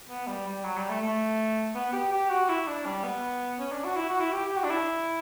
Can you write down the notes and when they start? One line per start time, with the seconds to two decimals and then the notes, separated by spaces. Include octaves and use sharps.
0.09 B3
0.27 G3
0.46 G3
0.64 F#3
0.77 G3
0.89 A3
1.02 A3
1.75 B3
1.93 G4
2.12 G4
2.30 F#4
2.49 E4
2.67 D4
2.86 G3
3.04 B3
3.59 C#4
3.72 D4
3.84 F#4
3.96 E4
4.09 F#4
4.20 E4
4.33 G4
4.45 G4
4.57 F#4
4.64 D4
4.70 E4